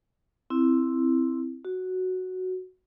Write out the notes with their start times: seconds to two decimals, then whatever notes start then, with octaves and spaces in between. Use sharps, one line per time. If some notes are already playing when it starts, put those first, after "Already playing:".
0.50 C4 E4
1.65 F#4